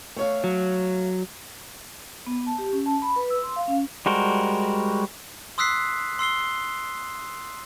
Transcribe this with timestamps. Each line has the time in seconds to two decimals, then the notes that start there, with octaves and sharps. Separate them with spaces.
0.16 A3 C#5 F5
0.44 F#3
2.27 B3
2.47 A5
2.58 G4
2.73 C#4
2.86 A5
3.02 B5
3.16 B4
3.30 E6
3.43 C6
3.56 F5
3.68 C#4
4.06 G3 G#3 F#4 A#4 C5
5.58 C6 D#6 E6 F#6 B6 C7
6.19 C6 E6 C7 G7